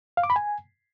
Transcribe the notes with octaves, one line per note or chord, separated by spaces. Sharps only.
F5
D6
B5
G#5